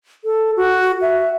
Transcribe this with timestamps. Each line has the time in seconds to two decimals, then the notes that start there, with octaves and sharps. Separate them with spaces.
0.25 A4
0.57 F#4
1.02 E5